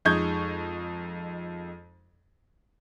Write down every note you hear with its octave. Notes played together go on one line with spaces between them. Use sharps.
F2 G#3 D#4 C#6 G6 G#6